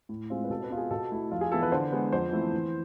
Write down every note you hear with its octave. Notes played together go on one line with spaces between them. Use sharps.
A2
G#3 C4 F4
B4
B2 A4
B4
B3 F4
G#4
B2 A4
A3 E4
F2 F4
G#4
E3 B3 E4 A4
B4
D3 C5
G#3 B3
F2 C5
E3 A3 C4 E4
E3